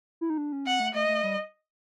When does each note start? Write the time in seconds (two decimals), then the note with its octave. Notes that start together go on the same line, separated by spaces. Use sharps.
0.21 E4
0.30 D#4
0.38 D4
0.52 C#4
0.66 C4 F#5
0.80 A3
0.94 A3 D#5
1.09 A3
1.23 G3